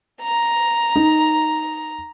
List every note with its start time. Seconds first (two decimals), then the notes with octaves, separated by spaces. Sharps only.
0.22 A#5
0.96 D#4